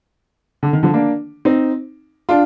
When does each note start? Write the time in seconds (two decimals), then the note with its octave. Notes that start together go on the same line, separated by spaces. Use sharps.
0.63 D3
0.73 D#3
0.83 D3 F3
0.94 A#3 D4
1.45 C4 D#4
2.29 D4 F4